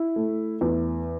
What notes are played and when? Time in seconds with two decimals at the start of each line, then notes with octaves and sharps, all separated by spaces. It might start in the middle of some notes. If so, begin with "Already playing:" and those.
Already playing: E4
0.16 A3
0.61 E2